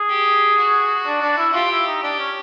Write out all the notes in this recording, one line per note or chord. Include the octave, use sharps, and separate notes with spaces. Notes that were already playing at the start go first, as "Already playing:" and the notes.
Already playing: G#4
G4
F#4
D4
D4
E4
F4 G4
E4
D#4
D4 G4
C#4